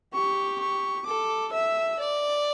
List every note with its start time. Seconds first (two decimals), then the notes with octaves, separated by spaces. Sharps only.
0.14 G4 C#6
0.60 C#6
1.06 A4 D6
1.53 E5 E6
1.99 D5